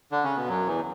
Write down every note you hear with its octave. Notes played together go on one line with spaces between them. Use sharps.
D3 D4
C#3 C#4
B2 B3
F#2 F#3
E2 E3